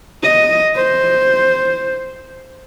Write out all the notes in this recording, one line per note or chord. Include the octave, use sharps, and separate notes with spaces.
D#5
C5